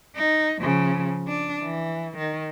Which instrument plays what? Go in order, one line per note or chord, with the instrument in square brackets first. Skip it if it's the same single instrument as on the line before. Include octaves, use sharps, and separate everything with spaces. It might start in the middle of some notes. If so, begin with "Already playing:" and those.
[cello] D#4
C#3 F3
D4
E3
D#3